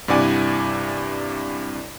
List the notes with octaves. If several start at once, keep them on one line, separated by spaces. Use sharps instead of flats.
G2 C3 E4 D5 F#5 G#5